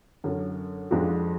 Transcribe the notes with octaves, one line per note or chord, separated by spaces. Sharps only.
F#2 D3 F#3
F2 F3 G#3 D4 F#4